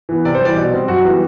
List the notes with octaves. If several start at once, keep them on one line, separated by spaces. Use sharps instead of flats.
E3 B3
C3 D5
C5
E3 G3 D5
B2
G3 C4
F#2 F#4
E3 G3 B3